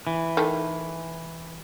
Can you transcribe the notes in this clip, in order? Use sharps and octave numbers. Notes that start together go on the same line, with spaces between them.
E3
D#3 A3